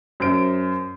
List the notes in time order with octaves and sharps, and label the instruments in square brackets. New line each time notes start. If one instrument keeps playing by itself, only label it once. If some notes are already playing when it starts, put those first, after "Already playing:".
[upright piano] F#2 C5 D7